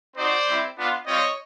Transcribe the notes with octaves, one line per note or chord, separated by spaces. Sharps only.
C4 D#4 F#4 C5 D5
G3 C4 E4
B3 D4 F4
G3 C4 F4 C#5 D#5